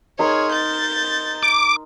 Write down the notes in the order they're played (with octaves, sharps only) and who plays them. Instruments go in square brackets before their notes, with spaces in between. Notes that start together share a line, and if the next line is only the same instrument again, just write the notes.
[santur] D#4 A#4 C6 [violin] G#4 C#5
[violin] G6 A6
[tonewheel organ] D6